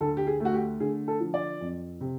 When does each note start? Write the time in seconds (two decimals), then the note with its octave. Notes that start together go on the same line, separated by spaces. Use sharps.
0.01 D2 A4
0.17 G4
0.27 G#4
0.40 A3
0.45 F#4
0.54 G4
0.80 D3 G#4
1.08 A4
1.20 F3
1.34 D5
1.61 F2
2.01 C3